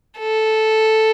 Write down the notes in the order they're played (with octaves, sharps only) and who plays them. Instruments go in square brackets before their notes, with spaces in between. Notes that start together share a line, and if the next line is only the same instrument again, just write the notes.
[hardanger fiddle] A4